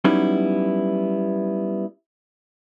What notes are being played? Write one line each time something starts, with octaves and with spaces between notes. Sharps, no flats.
F#3 G3 B3 C#4 D#4 E4